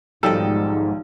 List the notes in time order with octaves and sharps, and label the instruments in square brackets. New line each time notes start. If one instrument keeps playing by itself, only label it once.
[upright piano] B1 F3 [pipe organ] G#2 [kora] D#3 G3 D#5 [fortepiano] A4